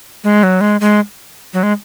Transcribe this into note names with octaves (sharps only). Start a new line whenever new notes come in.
G#3
F#3
G#3
G#3
F#3
G#3